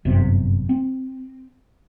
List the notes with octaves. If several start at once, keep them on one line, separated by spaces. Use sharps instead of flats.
G1 F#2 C3
C4